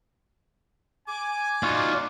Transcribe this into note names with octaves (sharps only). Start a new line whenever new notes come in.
G#5 D6
D#4 F4 F#4 D5